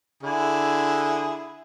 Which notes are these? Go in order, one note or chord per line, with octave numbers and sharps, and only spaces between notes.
D3 E4 G#4